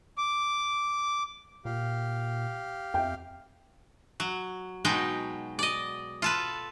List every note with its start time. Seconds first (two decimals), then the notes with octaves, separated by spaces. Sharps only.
0.18 D6
1.65 A#2 G4 F5
2.94 F2 E5 G5
4.20 F#3
4.85 B2 F#3 G#3 D#4 G5
5.59 D5 D#5
6.22 F4 A4 B4